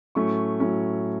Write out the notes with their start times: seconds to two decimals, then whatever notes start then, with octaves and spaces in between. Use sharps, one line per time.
0.15 A2 F#3 A3 C#4 C#6
0.60 A2 F#3 A3 C#4